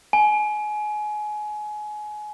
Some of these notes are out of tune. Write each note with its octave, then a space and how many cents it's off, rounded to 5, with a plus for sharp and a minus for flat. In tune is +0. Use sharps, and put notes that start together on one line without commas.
G#5 +25